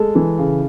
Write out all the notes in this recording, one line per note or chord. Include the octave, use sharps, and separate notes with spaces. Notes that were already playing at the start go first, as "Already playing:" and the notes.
Already playing: G#3 A4
E3
C#3